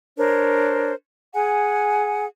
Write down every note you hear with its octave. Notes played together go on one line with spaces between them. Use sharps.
D4 A#4 C5 C#5
G#4 F#5 G#5